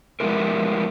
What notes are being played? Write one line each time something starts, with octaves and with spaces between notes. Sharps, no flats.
F3 G3 G#3 B3 E4 A#4